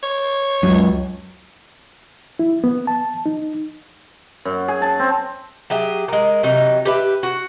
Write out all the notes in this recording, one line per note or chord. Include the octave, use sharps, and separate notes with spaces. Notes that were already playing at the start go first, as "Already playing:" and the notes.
C#5
C#2 F#2
E4
B3
A5
D#4
F#2
G#4
A5
C4
F#3 G4 G#4 E5
G#3 A#4
C3 E3 F#3 D#4
G4 B4 E5
F#4